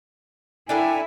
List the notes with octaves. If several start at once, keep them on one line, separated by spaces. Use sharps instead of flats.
D4 E4 A4 A#4 G5 G#5